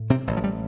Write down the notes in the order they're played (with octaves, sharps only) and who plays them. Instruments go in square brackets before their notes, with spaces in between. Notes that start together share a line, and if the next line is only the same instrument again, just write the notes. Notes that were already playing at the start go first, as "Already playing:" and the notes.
Already playing: [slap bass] A2
C3 C4
A1
F3
G3